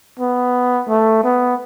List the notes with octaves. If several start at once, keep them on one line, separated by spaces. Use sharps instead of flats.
B3
A3
B3